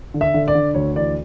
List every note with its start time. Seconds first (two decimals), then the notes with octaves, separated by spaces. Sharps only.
0.14 D3
0.21 E5
0.34 D3
0.48 D5
0.55 D3
0.74 D2 C#5
0.96 E3 D5